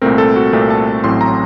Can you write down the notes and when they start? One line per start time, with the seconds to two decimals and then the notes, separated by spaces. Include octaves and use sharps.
0.02 C2 A#2 A3 C4 A#4
0.18 A4
0.36 F#4
0.53 C2 A#2 A3 C4 A#4
0.70 A5
1.04 A1 A2 F#3 C4 C6
1.21 A#5